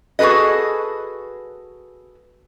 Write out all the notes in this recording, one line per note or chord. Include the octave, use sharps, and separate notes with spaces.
F#4 G#4 A4 B4 D#5